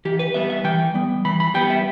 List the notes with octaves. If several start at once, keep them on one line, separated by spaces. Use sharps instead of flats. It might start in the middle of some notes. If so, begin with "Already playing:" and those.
E3 G4
B4
G3 B3 E5
E5
E3 G5
G3 B3
E3 B5
B5
G3 B3 G5
E5